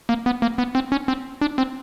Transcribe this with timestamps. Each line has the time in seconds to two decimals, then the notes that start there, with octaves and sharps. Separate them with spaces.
0.09 A#3
0.26 B3
0.42 A#3
0.58 B3
0.75 C4
0.92 C#4
1.08 C4
1.41 D4
1.58 C4